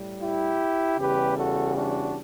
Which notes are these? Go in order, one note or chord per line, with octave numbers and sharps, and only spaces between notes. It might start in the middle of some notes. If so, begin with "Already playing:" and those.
Already playing: A2 G3
E4 G4
E2 C#3 G3 G4 B4
F#4 A4
D4 F#4